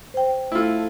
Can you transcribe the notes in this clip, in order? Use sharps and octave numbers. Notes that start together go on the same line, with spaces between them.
C5 G5
A3 E4 F4 E6